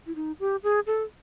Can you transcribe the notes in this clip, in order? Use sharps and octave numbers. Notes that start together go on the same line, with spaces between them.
E4
D#4
G4
G#4
A4